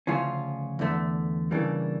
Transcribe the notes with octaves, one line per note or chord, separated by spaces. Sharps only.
D2 C#3 F3 C#4 F4
E2 D3 A3
C#3 E3 G3 A#3 D4